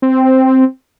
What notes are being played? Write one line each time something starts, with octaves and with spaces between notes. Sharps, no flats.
C4